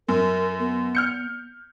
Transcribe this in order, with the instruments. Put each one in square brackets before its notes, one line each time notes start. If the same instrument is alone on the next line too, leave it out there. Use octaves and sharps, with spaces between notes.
[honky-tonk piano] F#2 [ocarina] A#4
[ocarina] B3
[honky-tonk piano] F6 G6 C#7